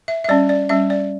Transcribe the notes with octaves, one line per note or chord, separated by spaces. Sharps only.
E5
E5
G3 C#4 D5
D5
G3 C#4 E5
D5